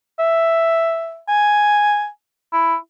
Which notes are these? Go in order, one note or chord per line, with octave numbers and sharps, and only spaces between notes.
E5
G#5
E4